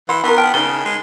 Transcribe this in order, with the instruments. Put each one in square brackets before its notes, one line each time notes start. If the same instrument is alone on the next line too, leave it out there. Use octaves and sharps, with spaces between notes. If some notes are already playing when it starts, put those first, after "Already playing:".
[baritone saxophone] E3 [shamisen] F#5 [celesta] B5 C6
[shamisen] E3 C4 A#4 [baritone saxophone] B3
[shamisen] G5 [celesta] A5 F6 D7
[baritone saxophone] C#3 [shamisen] B3 D#4 [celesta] G7
[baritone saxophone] G#3